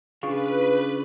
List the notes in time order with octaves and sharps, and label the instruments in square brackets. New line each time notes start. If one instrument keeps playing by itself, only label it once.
[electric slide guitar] C#3 D4 F4 [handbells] G#4 F5 C#6 [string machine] B4